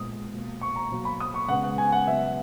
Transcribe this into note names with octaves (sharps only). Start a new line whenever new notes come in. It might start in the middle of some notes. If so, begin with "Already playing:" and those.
Already playing: A#2 G#3 B3 D#6
B2 A#3
C#6
A#5
B2 F#3 A#3
B5
D#6
C#6
C#3 G#3 B3 F#5
F#5
G#5
F#5
C#3 F#3 B3 E5